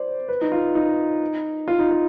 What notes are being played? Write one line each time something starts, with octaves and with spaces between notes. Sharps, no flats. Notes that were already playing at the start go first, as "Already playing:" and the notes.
Already playing: C5 D5
B4
D#4
F4
D#4
F4
D#4
F4